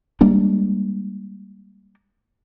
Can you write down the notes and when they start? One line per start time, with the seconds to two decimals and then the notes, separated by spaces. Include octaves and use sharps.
0.21 G3 G#3 A#3 D4